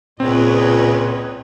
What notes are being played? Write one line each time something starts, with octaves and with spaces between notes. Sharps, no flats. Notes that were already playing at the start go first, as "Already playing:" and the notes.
C#2 A#2 C4 B4 C#5 D#5